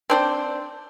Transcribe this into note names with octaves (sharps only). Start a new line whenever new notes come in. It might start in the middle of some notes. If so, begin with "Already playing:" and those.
C4 D4 C5